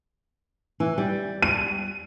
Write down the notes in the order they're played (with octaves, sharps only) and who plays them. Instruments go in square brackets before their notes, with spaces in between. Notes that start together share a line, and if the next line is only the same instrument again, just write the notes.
[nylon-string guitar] E3
G3
[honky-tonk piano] D#7